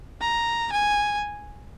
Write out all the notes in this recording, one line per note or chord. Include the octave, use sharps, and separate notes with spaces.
A#5
G#5